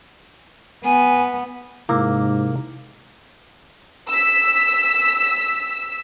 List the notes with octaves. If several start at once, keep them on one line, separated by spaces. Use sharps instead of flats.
B3 G#5
G#2 C3 A#3 E4 D6 E6
E6 B6